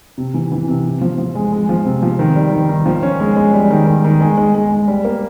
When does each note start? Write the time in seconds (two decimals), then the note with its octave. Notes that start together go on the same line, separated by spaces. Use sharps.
0.18 C3
0.34 E3
0.52 E3
0.68 C3
0.85 C3
1.01 F3
1.18 F3
1.35 G#3
1.53 G#3
1.69 F3
1.86 C3
2.02 F3
2.19 D#3
2.36 G3
2.53 D#3
2.69 D#3
2.86 F3
3.03 C#4
3.20 G#3
3.36 G#3
3.54 G3
3.70 D#3
3.87 D#3
4.04 D#3
4.21 G#3
4.38 G#3
4.55 G#3
4.71 G#3
4.88 G3
5.05 A#3